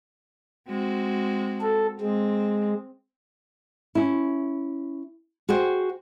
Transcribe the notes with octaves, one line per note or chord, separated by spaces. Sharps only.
G#3 C4 F#4
A4
G#3 C4
C#4 E4
F#4 G#4 C5 G5